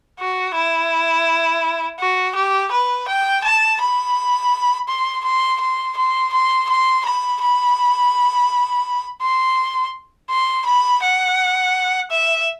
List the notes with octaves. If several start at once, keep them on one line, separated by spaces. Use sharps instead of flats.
F#4
E4
F#4
G4
B4
G5
A5
B5
C6
C6
C6
C6
C6
C6
B5
B5
C6
C6
B5
F#5
E5